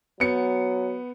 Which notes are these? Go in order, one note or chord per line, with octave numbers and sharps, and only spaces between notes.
F#3 B3 C#7